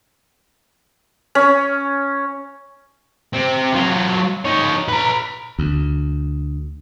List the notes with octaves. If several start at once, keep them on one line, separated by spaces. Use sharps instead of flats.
C#4
C3 C4
F#3 F4
D#4 C#5
B4 A#5
D2